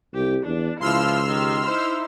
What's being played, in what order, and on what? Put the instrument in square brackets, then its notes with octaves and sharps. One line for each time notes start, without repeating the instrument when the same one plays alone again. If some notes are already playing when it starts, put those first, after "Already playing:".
[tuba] C2 [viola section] G4
[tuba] E2 [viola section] D4
[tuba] C#2 [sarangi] F3 [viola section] E4 F4 F5 [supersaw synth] C6 E6 F6
[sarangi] D#3 [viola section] G4
[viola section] D#4 E4 [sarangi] C5